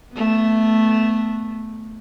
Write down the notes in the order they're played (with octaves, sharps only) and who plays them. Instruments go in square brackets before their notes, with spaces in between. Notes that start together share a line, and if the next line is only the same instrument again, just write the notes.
[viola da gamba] A3 B3